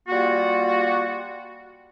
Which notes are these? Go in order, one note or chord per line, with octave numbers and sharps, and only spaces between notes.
G3 A#3 F4 F#4